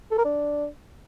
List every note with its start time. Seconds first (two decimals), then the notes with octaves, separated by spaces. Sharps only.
0.11 A4
0.18 A#4
0.25 D4